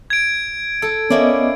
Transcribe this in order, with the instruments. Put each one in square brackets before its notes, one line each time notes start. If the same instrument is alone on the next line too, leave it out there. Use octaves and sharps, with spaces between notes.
[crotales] G#6 D7
[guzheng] A4
[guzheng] A#3 E4 D5 [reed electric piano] B3 D#5 [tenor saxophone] C#4